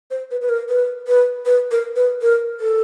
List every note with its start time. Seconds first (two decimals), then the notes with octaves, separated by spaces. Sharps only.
0.11 C5
0.31 B4
0.41 B4
0.49 A#4
0.69 B4
1.07 B4
1.45 B4
1.71 A#4
1.96 B4
2.22 A#4
2.60 A4